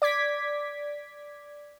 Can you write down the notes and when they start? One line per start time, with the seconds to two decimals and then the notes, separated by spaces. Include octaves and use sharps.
0.02 D5 D6 G#6 B6